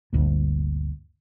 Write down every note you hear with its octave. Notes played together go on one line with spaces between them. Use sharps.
G1 D2 A#2